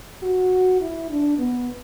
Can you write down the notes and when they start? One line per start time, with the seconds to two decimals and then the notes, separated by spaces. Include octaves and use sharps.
0.23 F#4
0.80 E4
1.10 D4
1.38 B3